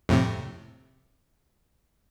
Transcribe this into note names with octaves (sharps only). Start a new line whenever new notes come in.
F2 A2 C3